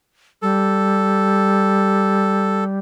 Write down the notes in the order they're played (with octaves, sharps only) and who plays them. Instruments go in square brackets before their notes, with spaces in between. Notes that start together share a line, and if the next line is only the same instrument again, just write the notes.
[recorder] G3 [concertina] A4